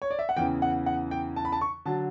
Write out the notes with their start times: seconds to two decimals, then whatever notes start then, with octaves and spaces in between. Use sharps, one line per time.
0.02 C#5
0.11 D5
0.19 E5
0.29 F#5
0.37 E2 C#3 E3 G5
0.62 F#5
0.86 F#5
1.11 G5
1.36 A5
1.45 B5
1.52 A5
1.61 C#6
1.85 D3 F#3 A5